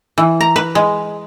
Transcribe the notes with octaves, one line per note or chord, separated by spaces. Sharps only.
E3
A#5
B4
G#3